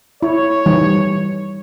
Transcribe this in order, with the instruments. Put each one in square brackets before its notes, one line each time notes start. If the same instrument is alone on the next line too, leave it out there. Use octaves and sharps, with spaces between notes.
[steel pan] E4 [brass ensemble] C#5
[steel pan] E3 G3 D#4